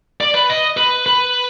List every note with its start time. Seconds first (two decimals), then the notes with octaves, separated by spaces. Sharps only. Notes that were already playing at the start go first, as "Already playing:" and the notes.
0.21 D5
0.35 B4
0.50 D#5
0.77 B4
1.06 B4